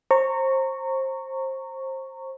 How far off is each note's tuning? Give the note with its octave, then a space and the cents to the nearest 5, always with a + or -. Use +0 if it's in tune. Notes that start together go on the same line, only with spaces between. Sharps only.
C5 +25 A#5 -25 C#6 +0